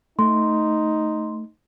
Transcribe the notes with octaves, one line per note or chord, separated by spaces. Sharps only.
A3 D#4 C6